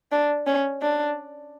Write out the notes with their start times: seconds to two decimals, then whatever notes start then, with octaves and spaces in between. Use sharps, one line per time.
0.11 D4
0.47 C#4
0.82 D4